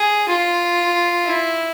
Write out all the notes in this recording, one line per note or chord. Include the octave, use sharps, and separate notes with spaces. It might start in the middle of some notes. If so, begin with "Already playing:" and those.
Already playing: G#4
F4
E4